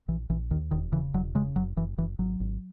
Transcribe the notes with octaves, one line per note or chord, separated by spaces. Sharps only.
A#1 E3
A#1 E3
D#2 D#3
E1 D#3
C#3 E3
E1 F#3
C#3 G#3
F#1 F#3
F#1 E3
F#1 E3
G#1 F#3
G#1